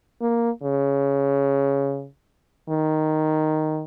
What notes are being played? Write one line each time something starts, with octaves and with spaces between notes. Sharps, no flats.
A#3
C#3
D#3